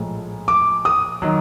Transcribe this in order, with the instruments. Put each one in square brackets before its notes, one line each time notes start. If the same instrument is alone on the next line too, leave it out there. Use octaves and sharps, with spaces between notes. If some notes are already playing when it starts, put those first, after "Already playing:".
Already playing: [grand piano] A#1 A2 F3 G#3
[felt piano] D6
D#6
[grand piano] D#3 F#3